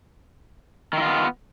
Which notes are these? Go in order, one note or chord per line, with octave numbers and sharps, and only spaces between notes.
D#3 B3 E4 F4